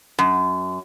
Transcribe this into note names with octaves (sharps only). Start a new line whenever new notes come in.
F#2